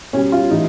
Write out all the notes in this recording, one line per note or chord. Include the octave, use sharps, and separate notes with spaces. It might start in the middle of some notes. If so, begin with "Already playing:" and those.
B2 G3 C#4
F4
A2 E3 G3 D#4